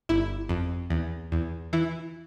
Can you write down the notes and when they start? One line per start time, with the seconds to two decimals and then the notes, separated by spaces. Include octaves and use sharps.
0.09 G1 E4
0.49 F2
0.90 E2
1.32 E2
1.73 E3 E4